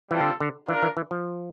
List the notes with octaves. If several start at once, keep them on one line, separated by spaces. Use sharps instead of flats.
E3 G3 C4 F4 A4
D3
D3
E3 D4 F4 A#4
E3
E3
F3